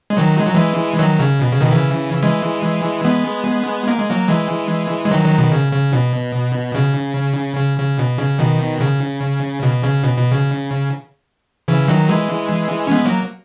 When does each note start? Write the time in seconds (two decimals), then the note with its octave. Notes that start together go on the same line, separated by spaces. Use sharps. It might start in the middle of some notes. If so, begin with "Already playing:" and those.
0.10 G#3
0.17 D#3 F#3
0.39 G#3
0.47 F#3
0.54 E3 G#3
0.99 D#3 F#3
1.20 C#3
1.41 B2
1.52 C#3
1.61 B2 D#3
1.71 C#3 E3
2.23 E3 G#3
3.05 G#3 B3
3.88 A#3
3.99 G#3
4.09 F#3 A#3
4.28 E3 G#3
5.05 G#3
5.11 D#3 F#3
5.24 D#3 F#3
5.38 B2 D#3
5.52 C#3
5.72 C#3
5.93 B2
6.74 C#3
7.57 C#3
7.78 C#3
7.99 B2
8.19 C#3
8.39 B2 D#3
8.81 C#3
9.63 B2
9.83 C#3
10.03 B2
10.18 B2
10.31 C#3
11.68 C#3 E3
11.88 D#3 F#3
12.09 E3 G#3
12.87 C#4
12.91 G#3 B3
13.05 F#3 A#3